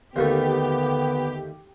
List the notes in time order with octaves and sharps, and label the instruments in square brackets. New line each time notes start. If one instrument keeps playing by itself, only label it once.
[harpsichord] D#2 D#3 A3 [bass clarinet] D3 [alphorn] B3 [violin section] G4